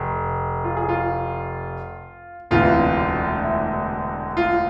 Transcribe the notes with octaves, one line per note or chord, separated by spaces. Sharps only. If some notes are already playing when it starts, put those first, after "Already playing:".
Already playing: F1
F4
G#4
F4
E1 D2 C3 E3 F4
E4
F4